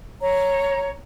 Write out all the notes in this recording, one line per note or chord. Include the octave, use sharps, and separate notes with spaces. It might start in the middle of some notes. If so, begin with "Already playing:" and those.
C#5 A#5